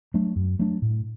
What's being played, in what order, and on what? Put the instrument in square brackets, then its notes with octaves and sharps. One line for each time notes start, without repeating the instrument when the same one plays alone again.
[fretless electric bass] F#3 A3 D4
F#2
F#3 A3 D4
A2